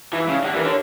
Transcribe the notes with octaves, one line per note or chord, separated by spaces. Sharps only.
E3 E4
E4
C#3
D4
D3 G4
E3 A#4
D3 C#5